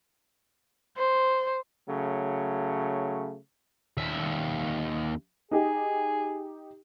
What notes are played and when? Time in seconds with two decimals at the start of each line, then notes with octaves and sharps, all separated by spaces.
0.98 C5
1.88 C#3 F#3 A3
3.98 D#2 E5
5.51 D#4 G4 G#4